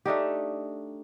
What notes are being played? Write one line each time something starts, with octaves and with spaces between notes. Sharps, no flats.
A3 D4 D#4 G4